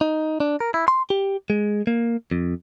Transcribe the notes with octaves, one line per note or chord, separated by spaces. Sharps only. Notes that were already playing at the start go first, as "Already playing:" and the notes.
D#4
D4
A#4
E4
C6
G4
G#3
A#3
F2